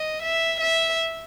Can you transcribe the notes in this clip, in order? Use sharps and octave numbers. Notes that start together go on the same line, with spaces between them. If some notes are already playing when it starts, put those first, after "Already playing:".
Already playing: D#5
E5
E5